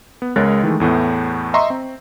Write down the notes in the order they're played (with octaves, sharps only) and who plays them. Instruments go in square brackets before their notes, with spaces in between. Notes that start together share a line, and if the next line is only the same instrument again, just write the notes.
[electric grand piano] B3
C#2 G#3 A#4 C#5 F#6 A6
D#3 E3 G#3 A3
E2 A2 A3 B3
D#5 E5 A#5 C6 C#6
C4